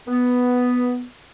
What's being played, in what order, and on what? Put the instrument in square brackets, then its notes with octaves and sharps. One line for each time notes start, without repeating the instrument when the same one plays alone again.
[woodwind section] B3